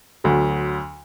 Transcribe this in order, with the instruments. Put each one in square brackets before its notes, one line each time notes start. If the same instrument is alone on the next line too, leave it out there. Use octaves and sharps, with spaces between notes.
[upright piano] D2 D3 F#3